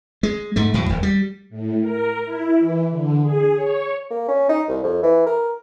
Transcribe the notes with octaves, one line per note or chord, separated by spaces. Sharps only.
G#3
G#2 A3
E2 A2 F#3
D#1
G3
A2
A#4
E4
E3
D3
G#4
C#5
A#3
C#4
D#4
C2
F2
E3
A#4